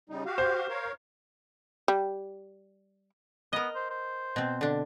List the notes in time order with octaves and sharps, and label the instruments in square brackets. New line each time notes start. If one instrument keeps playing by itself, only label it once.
[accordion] C#3 G3 D#4
F#4 G4 F5
[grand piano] C5
[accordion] A#4 C#5 F5
[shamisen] G3
[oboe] B3 [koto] A#4 D#5
[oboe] C5
C5
[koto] B2 C4
D3 D4